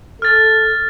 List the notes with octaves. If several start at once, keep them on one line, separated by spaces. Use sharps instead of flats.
A4 F6 A6